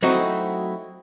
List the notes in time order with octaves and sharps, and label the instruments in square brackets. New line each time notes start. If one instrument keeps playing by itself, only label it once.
[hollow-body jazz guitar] F#3 A3 C4 D#4 E4 F#4